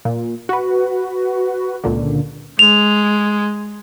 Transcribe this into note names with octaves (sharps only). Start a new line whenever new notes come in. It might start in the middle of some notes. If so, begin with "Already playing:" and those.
A#2
F#4 B4
C#2 A#2 D3
G#3 F7